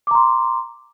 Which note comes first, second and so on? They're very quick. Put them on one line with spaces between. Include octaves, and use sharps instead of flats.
D6 A#5 C6